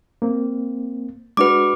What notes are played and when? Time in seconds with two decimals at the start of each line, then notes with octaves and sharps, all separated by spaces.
0.22 A#3 C4
1.37 G#3 D4 F#4 B4 D6